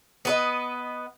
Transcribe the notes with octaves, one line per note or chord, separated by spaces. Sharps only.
B3 B4 D#5